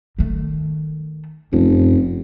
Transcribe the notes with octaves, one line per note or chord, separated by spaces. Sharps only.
D#3 A3
F1 F#2